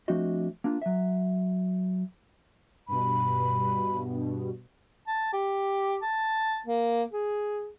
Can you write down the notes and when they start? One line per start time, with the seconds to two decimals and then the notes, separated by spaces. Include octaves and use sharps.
0.08 F3 A3 C4 D4 F#4 D#5
0.64 A#3 D4 F4
0.82 F#3 E5
2.88 G2 B2 B5
5.07 A5
5.33 G4
6.02 A5
6.66 A#3
7.13 G#4